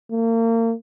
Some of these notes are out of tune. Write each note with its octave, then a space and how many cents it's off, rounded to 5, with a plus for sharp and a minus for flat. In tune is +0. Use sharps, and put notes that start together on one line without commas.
A#3 -35